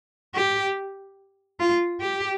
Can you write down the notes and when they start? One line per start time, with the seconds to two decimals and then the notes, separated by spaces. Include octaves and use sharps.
0.35 G4
1.60 F4
2.00 G4